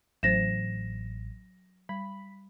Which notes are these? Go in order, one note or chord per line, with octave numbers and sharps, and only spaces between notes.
A1 F#3 C5 A6 A#6 E7
G3 B5